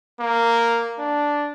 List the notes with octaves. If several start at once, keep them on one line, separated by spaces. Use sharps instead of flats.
A#3
D4